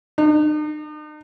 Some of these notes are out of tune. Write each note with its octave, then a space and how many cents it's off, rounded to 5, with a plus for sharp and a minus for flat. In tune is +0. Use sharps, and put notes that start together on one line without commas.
D#4 -45